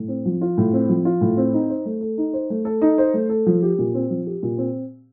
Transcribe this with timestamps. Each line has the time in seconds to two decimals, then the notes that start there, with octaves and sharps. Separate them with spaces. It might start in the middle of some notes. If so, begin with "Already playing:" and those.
Already playing: A2
0.08 C4
0.25 F3
0.41 F4
0.58 A2
0.73 C4
0.89 F3
1.05 F4
1.21 A2
1.37 C4
1.53 D#4
1.69 C5
1.85 A3
2.01 A4
2.18 D#4
2.33 C5
2.50 A3
2.65 A4
2.82 D#4
2.98 C5
3.14 A3
3.29 A4
3.46 F3
3.63 G4
3.79 A#2
3.94 C4
4.10 F3
4.27 G4
4.43 A#2
4.58 C4